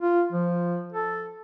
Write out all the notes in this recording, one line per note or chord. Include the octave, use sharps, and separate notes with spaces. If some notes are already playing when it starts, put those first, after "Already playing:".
F4
F3
A4